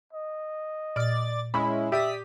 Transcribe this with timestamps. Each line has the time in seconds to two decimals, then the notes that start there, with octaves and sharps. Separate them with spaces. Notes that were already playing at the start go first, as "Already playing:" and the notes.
0.13 D#5
0.96 A#2 D5 F6 A6
1.54 G#3 C#4 E4 B5
1.92 G4 D5 E5 D#6 B6